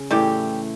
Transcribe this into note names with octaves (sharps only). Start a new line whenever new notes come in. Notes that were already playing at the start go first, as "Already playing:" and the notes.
Already playing: C#3
A2 E3 G3 A3 G4